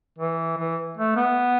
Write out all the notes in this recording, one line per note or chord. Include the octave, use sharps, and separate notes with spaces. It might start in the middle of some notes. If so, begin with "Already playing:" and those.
E3
E3
A3
B3